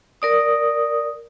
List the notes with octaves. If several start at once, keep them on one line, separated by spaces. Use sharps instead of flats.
A#4 D5 D#6